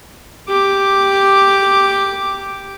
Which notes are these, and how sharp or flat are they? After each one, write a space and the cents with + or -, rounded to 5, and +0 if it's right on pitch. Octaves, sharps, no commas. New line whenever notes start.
G4 +0 D6 +0